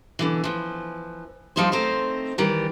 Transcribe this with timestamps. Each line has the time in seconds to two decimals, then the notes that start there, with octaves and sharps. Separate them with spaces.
0.19 B2 D3 E3
0.44 E3 F3
1.56 F3 G3 D#4 F4 C5
1.72 A3 C4 D#4 C5
2.38 D#3 E3 G3